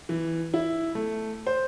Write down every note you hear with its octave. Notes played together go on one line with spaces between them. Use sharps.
E3
E4
A3
C5